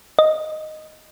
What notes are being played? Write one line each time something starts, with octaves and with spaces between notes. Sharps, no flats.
D#5